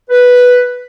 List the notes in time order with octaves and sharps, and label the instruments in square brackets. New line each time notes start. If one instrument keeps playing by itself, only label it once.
[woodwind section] B4